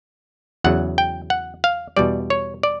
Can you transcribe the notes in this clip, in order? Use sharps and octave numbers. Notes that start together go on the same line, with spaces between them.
E2 C#3 F#3 F#5
G5
F#5
F5
E2 B2 G3 D5
C#5
D5